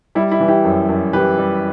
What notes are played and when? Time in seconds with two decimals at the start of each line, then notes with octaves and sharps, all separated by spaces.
0.15 G3 E4
0.32 E4
0.40 E3
0.48 E4 G4
0.65 F#2
0.89 F#2
1.13 E3 G4 B4
1.38 G3